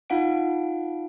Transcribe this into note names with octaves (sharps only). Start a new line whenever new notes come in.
D#4 F4 F5 F#5 D7